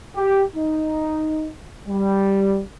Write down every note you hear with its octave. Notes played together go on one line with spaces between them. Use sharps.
G4
D#4
G3